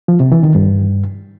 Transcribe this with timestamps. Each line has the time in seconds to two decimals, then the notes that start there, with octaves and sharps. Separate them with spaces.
0.08 F3
0.20 C3
0.32 E3
0.43 D#3
0.55 G2